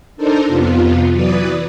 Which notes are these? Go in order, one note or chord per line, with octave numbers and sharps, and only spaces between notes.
D4 D#4 A4 A#4 C5
F2 C3 B3 F4
E3 F#3 B4 D5 D#6